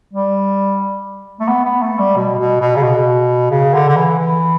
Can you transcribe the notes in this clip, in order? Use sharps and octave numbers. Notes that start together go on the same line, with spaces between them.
G3
A3
B3
B3
A3
G3
B2
B2
B2
C#3
B2
C#3
D3
D3
E3
E3